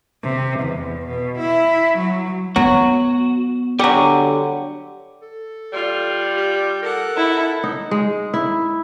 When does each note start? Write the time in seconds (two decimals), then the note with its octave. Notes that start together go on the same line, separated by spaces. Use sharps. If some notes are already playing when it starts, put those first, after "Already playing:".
0.23 C3
0.60 E2
1.07 B2
1.38 E4
1.97 F#3
2.56 F#3 B3 F#4
3.79 D3 F#3 G3 G4 F#5 G#5
5.22 A4
5.73 G3 F4
6.37 G4
6.82 A4 A#4 F#5
7.16 E4
7.64 D#4
7.91 G#3
8.34 E4